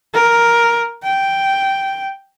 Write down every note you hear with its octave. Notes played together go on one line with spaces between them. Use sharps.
A#4
G5